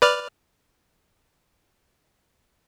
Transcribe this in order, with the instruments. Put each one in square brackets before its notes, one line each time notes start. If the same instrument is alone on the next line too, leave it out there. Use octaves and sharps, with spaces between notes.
[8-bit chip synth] B4 D5 F6